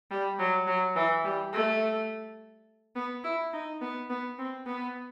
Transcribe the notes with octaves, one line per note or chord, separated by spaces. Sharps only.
G3
F#3
F#3
E3
G3
A3
B3
E4
D#4
B3
B3
C4
B3